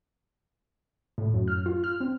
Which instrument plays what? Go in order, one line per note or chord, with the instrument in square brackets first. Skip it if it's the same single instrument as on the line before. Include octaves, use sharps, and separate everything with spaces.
[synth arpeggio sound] A2
F#2
F6
F4
F6
C4